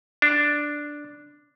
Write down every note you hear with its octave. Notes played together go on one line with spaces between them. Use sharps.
D4